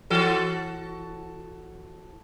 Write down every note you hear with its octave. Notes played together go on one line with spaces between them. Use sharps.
E3 F#4 A4